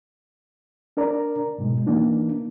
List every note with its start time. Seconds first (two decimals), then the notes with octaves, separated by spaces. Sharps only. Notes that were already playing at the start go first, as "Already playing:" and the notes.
0.97 D4 A#4 D5 A#5
1.58 G#2 B2 G#3
1.86 E3 A#3 D4 D#4